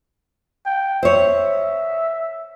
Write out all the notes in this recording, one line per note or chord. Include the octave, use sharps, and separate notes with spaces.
G5
C5 C#5 E5